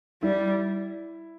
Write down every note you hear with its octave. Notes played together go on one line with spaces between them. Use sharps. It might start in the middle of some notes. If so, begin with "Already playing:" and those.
G3 E4